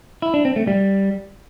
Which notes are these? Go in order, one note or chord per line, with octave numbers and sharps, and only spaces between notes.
E4
D4
C4
A3
G3